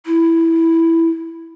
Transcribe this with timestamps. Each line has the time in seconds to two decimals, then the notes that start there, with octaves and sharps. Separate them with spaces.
0.06 E4